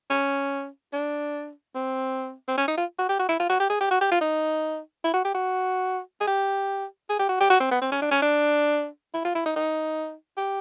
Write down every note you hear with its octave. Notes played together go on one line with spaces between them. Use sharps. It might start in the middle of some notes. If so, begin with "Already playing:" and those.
C#4
D4
C4
C4
C#4
D#4
F4
F#4
G4
F#4
E4
F4
F#4
G4
G#4
G4
F#4
G4
F4
D#4
E4
F#4
G4
F#4
G#4
G4
G#4
G4
F#4
G4
F#4
C4
B3
C4
C#4
D4
C#4
D4
E4
F4
E4
D#4
D#4
G4